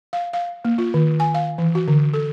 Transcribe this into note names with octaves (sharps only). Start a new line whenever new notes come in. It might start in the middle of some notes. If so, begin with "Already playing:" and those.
F5
F5
A#3
F4
D#3
G#5
F5
E3
F#4
D3
A4